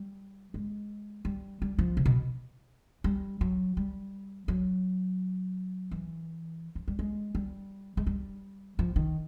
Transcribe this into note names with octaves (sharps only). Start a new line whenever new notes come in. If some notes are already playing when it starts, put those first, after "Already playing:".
Already playing: G3
G#3
G3
G3
F3
C3
B2
G3
F#3
G3
F#3
E3
F3
G3
G#3
G3
G#3
G3
F3
D#3